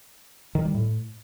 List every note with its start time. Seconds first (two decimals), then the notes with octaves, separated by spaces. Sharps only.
0.55 D#3
0.65 G3
0.75 A2